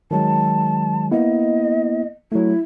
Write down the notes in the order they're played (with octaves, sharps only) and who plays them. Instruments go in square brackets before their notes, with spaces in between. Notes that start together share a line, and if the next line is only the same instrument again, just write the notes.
[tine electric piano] D#3 F#3 G#3 [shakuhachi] A5
[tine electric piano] A#3 B3 E4 [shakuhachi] D#5
[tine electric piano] F#3 A3 [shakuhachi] E4